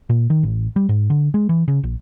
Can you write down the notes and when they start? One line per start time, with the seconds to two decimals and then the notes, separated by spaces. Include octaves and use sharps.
0.10 A#2
0.30 D#3
0.43 A1
0.76 G3
0.89 G#2
1.10 D3
1.34 G#3
1.49 E3
1.68 C#3
1.83 A#1